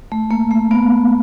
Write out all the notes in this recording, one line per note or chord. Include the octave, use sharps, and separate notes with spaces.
A3
A#3
A3
B3